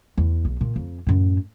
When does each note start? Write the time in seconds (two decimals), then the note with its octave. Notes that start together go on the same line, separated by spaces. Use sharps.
0.18 E2 E3
0.45 B1
0.61 A#2
0.76 F2
1.07 F#2 A2